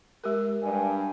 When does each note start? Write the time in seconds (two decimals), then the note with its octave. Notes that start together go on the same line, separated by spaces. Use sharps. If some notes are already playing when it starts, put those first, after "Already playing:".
0.24 G#3 G4 A#4
0.62 G2 G#5